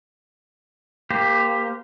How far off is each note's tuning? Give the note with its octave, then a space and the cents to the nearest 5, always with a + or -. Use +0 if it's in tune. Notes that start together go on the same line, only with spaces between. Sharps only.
A#3 +0 G4 +15 C5 -30